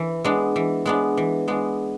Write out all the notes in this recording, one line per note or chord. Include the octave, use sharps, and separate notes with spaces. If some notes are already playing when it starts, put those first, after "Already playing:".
Already playing: E3
G#3 B3 D4
E3
G#3 B3 D4
E3
G#3 B3 D4